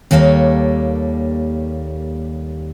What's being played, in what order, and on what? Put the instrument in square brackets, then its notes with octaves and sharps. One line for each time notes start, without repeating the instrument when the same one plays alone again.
[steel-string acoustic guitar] D#2 G3 A#3 A4 C#5